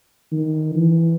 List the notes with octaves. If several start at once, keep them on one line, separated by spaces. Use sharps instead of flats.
D#3
E3